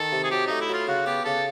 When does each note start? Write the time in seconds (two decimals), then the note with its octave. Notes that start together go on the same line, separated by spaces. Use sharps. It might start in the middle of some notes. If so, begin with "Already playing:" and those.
Already playing: D#3 A4
0.12 C3
0.24 G#4
0.31 F#3 G4
0.47 A3 D#4
0.60 E4
0.69 F#3 F4
0.87 C#3 F#4
1.06 B3 G4
1.25 C#3 A4